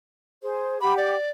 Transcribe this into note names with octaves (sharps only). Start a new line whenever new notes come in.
G#4 C5
G4 F#5 B5 D6
D5